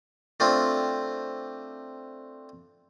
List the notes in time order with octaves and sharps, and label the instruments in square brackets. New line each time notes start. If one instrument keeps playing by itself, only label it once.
[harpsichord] A3 C4 D4 F4